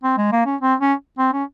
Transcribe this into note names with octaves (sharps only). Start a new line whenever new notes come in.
C4
G#3
A#3
C#4
C4
C#4
C4
C#4